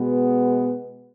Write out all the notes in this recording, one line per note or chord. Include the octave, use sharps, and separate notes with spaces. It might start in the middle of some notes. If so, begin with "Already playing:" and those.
Already playing: B2 G#3 B3